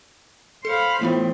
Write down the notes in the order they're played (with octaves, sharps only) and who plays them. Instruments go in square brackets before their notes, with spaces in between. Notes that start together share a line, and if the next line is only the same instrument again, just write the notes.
[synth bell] A4 C#7 [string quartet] C5 F5 B5
[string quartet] A2 E3 C4 [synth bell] A3 B3 F4